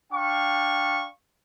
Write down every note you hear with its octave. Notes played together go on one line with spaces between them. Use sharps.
D4 F5 G5 C#6